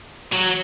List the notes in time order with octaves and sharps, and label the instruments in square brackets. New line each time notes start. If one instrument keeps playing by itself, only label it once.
[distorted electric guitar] F#3